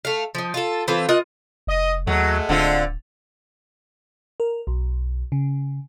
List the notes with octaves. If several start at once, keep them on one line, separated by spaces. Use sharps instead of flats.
A3 F5
F3 D#4
F4 A4
E3 C4 F4 A4
F4 A#4 D#5 F#5
F1 D#5
D#2 F#3 G#3 A3
D1 D3 C4 F4
A#4
B1
C#3